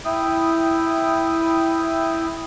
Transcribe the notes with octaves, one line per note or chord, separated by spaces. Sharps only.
E4 G5 D#6